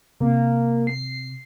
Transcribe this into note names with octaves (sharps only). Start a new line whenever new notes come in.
C3 A#3
C7